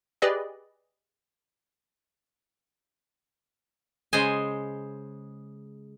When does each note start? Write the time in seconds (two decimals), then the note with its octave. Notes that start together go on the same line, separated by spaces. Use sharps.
0.22 G4 G#4 B4 D5 D#5
4.13 C#3 G#3 C5 D#5 G#5